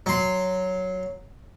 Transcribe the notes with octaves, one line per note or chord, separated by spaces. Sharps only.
F#3 C6